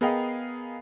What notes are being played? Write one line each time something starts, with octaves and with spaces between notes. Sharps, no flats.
B3 G#4 A#4 D#5 F5 G5